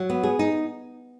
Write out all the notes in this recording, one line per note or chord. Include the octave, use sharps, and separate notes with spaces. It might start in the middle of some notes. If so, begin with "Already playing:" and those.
Already playing: F#3
B3
G#4
D#4